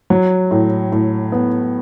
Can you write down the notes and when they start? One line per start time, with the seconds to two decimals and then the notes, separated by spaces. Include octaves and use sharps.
0.10 F#3
0.51 A2
0.92 A2
1.32 B3